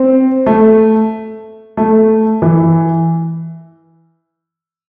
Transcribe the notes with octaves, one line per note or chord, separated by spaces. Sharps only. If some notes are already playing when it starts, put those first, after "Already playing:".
Already playing: C4
A3
A3
E3